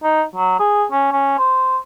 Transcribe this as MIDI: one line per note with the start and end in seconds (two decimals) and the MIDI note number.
0.03 0.23 63
0.36 0.58 54
0.60 0.85 68
0.92 1.08 61
1.12 1.37 61
1.38 1.78 72